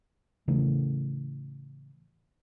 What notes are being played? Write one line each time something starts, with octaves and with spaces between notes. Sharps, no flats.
A2 C#3 E3 A3